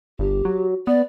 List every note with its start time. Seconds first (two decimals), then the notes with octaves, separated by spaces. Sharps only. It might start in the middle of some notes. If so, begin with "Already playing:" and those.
0.19 G1 G4
0.45 F#3
0.87 B3 D5